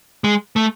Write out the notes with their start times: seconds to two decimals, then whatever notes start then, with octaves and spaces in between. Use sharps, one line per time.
0.24 G#3
0.56 A3